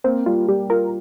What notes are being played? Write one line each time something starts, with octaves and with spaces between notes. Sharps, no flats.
A#3 C4
G3 F4
G3 G4
F4 A#4